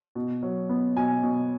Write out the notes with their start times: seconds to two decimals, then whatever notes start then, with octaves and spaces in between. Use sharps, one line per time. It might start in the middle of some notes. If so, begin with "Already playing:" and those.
0.15 B2
0.43 F#3
0.69 B3
0.97 B2 G#5
1.23 B2